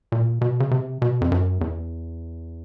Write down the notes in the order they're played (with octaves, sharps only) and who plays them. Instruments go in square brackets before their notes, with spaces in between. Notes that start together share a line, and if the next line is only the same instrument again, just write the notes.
[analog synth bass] A#2
B2
C#3
C3
B2
F2
F#2
E2